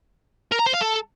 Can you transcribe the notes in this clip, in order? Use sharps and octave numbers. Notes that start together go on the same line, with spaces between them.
A#4
A#5
C5
F5
A4